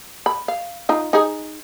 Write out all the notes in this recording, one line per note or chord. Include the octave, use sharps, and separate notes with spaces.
B5
F5
D#4 F4
D#4 G#4